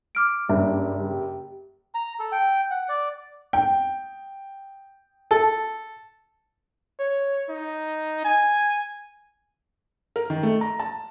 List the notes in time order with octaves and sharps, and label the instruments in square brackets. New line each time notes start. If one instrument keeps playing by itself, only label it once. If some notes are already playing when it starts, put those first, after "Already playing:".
[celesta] D6 F6 D7
[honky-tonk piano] F#1 [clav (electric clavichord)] G2 [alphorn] G3 [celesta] E5
[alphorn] G4
[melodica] A#5
A4
G5
F#5
D5
[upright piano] G5
[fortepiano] A4
[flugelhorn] C#5
D#4
G#5
[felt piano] A#4
D#3
A3
A#5
A5